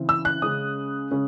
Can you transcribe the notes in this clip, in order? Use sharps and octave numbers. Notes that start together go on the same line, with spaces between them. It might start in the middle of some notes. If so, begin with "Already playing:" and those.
Already playing: C#3 E3 C4
E6
F#6
C#3 G#3 C#4 D#6
C#3 G#3 C#4